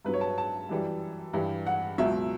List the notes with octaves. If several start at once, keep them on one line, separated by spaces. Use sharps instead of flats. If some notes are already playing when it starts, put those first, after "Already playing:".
G2 F#3 B4
C#5
A5
A5
F#2 E3 G3
G2 E3 G3
F#5
C#2 B2 F#3 E5